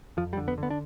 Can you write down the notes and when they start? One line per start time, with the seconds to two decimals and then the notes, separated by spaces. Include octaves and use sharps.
0.17 F2 F3
0.33 G3
0.37 D3
0.48 B3
0.58 D3
0.63 B3
0.70 D4